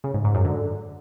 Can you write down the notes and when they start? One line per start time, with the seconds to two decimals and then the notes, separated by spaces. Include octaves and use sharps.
0.04 C#3
0.14 G#2
0.24 G#2
0.35 F#2
0.45 D3